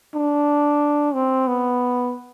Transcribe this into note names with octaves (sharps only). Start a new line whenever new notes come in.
D4
C4
B3